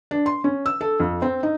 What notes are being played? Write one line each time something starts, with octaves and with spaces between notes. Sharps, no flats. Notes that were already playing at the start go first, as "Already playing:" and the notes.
D4
C6
C#4
E6
A4
F2
C4
D#4